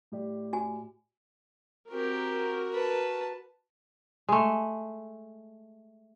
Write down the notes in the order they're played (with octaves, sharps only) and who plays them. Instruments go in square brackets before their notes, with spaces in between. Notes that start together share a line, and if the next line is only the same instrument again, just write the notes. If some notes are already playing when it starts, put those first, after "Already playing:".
[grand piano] A2 G4 D5
[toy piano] F#4 G#5
[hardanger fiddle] C4 G4 [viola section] F#4 A#4
[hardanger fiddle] B4 A5
[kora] G#3 A3